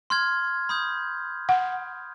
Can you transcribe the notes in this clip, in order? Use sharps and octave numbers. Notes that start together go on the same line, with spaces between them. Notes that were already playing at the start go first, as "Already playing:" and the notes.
C6 F6 G#6
B5 D#6 G6
F#5